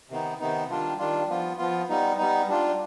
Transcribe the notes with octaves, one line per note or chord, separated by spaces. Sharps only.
C3 D#3 B3 D#4
C3 D#3 B3 D#4
D#3 G3 D4 F4
D#3 G3 D4 F4
F3 B3 F4
F3 B3 F4
G3 B3 D#4
G3 B3 D#4
G3 D4 F4